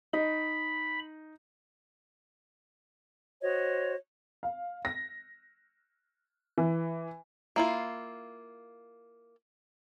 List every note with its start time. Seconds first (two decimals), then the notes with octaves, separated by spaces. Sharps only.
0.13 D#4 B5
3.41 F#4 C5 C#5 D#5
4.43 F5
4.85 A#6
6.58 E3
7.56 A#3 E4 F4